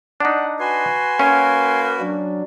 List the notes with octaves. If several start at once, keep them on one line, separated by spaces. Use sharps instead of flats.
D4 D#4 F#5
F#4 B4 G#5 C6
A#3 C#4
F#3 D4